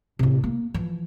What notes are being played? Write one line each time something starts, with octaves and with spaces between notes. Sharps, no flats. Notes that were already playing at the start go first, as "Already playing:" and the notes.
A1 C3
A#3
E3 F3